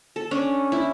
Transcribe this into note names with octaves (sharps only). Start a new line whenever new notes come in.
A4
C#4 D4
E4